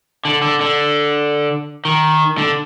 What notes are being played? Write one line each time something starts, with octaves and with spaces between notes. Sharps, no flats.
D3
D3
D3
D#3
D3